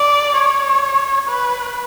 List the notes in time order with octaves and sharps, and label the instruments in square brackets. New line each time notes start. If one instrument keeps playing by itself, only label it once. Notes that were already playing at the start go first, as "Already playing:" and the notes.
Already playing: [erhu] D5
C#5
B4